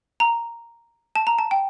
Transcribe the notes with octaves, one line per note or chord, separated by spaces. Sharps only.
A#5
A5
A#5
A5
G5